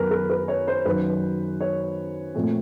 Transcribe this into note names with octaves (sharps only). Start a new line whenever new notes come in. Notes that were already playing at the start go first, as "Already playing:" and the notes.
Already playing: F#2 D#3 F#3 B3 A#4 B4
A#4
B4
C#5
C5
F#2 D#3 F#3 B4
C#5
A#2 F3 A3 C4